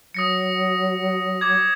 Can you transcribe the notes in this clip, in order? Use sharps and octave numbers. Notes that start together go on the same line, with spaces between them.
F#3 D#6 A#6 C#7
D6 G#6